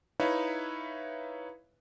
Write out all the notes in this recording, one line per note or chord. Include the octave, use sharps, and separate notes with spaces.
D#4 E4 B4 C#5 E5 F5